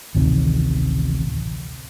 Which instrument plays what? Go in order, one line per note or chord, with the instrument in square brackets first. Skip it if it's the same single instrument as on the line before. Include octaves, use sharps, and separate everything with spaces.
[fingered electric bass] A1 D2 C3 D#3